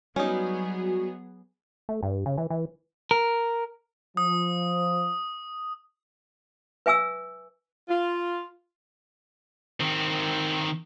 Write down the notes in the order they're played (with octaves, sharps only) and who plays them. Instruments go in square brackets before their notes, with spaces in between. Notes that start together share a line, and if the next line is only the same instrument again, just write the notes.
[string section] F#3 B3 G#4 [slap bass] G3 [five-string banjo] C#4 D#4 [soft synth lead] F#4
[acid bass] A3
G2
C#3
E3
E3
[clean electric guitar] A#4
[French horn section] F3 [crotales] D#6
[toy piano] B4 E5 G#5 D6 E6
[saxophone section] F4
[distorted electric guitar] D#3 C4